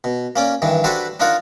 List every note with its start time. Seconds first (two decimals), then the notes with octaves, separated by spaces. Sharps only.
0.04 B2
0.36 A#3 C#4 D5
0.62 G2 D#3 E3
0.84 D4 F#4 G4 A4 B4 C5
1.20 D4 D#4 F4 A#4 F#5